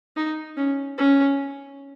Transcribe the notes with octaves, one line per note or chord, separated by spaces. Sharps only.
D#4
C#4
C#4